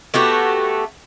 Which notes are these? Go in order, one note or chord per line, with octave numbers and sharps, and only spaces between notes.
A3 B3 F#4 G4